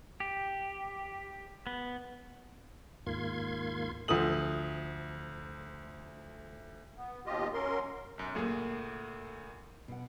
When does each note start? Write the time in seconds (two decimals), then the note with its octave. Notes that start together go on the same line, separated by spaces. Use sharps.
0.20 G4
1.67 B3
3.07 D#2 G#2 A#3 F4 C6 G#6
4.08 D2 F3 A3 D#6 F#7
6.98 B3
7.26 D#2 B2 F4 G4 D#5
7.54 F#3 C#4 A#4 C6
8.18 B1 F#2
8.35 D2 A#2 A3 A#3 G#4
9.88 B2 F#5